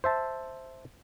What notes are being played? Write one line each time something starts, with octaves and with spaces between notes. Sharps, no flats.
C5 E5 A5